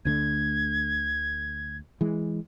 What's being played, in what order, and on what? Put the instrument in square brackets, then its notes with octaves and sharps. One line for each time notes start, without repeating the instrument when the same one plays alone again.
[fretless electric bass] D2 D3 A3 [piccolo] G#6
[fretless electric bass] E3 G#3